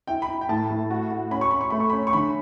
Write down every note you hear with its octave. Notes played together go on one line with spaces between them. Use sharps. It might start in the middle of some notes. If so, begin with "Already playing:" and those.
E4 G5
B5
E4
G5
A2 A5
A2
F#4
F#4
C#4 B5
C#6
C#4 B5
C#6
A3 B5
C#6
C#4 B5
C#6
D3 B5